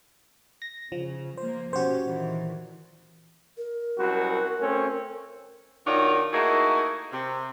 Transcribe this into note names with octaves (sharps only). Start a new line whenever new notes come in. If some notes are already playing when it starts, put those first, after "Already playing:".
A#6
C#3 F3
F3 A#3 C5
B2 C#4 F#4 G4 C5
A#2 D#3 E3
A#4
C2 F#2 F#4
A3 C4 C#4
B2 D#3 D4 F4 F#4 C#5
A3 A#3 D#4 E4 F#4 G#4
C3